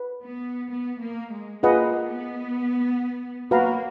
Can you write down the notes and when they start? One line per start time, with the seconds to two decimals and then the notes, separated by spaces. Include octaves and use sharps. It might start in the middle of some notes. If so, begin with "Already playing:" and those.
Already playing: B4
0.22 B3
0.70 B3
1.00 A#3
1.32 G#3
1.63 A#3 F4 G#4 B4 D#5 F#5
2.10 B3
3.51 A#3 F#4 B4 F5 A#5